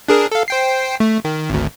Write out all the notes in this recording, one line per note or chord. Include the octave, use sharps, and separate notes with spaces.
D4 G#4 A#4
A4 F5
C5 G5 C7
A3
D#3
G#1 D2